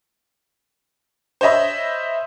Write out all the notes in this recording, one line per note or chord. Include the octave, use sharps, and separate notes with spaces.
C5 C#5 D#5 E5 B5